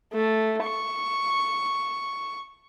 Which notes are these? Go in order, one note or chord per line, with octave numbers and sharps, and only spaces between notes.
A3
C#6